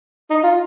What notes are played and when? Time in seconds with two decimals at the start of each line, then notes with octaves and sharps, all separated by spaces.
0.30 D#4
0.44 F4